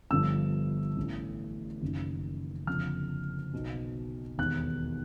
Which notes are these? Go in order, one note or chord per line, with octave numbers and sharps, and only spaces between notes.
G1 G2 D3 F3 E6
A1 A2 E3
F#1 F#2 D#3
F#1 F2 D3 F3 F6
B1 B2
E1 D#2 D#3 F#6